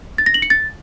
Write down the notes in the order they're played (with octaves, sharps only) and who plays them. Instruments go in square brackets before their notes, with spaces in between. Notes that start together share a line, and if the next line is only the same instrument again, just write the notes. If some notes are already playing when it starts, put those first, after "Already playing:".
[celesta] A6
A#6
F#7
C#7
A6